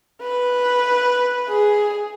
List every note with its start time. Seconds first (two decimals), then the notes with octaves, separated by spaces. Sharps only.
0.22 B4
1.49 G#4